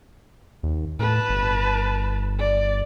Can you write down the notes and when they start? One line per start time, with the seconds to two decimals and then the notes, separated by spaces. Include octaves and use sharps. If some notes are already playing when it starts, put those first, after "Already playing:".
0.63 D#2
0.99 A2 B4 A5
1.30 G1
2.39 D5